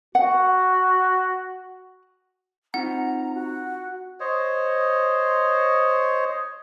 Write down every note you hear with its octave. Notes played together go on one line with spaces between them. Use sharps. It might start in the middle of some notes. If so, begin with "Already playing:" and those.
F#4 F#5
C4 D#4 F4 F#5 A#5
F#4
C5 C#5 D#5